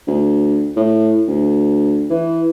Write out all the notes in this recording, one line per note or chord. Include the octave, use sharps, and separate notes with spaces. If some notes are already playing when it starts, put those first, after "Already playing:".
D2
A2
D2
E3